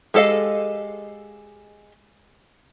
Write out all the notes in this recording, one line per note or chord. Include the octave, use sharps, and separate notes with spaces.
G#3 G4 A4 D#5 F5